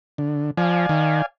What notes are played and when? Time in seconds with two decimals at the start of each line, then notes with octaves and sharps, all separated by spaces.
0.18 D3
0.57 F3 D5 F5 G#5
0.89 D#3